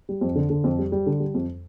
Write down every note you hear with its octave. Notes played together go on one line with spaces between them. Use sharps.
G3
F2
D3
D3
F2
G3
G3
D3
G3
F2